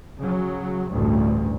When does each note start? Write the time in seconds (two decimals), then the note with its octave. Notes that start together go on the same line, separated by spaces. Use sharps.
0.19 C#3 F#3
0.92 A1 D2 G2